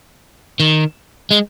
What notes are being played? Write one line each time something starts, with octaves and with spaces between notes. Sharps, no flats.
D#3
G#3